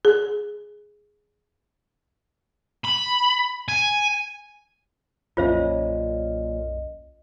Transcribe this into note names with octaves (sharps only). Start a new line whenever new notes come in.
G#4
B5
G#5
B1 F#2 A#2 C#4 F4 C5 D#5 E5